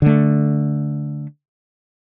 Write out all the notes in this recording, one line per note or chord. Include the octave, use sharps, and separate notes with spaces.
D3 A3